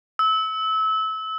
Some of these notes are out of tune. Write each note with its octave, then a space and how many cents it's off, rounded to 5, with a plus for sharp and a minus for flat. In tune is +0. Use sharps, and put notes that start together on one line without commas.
E6 -25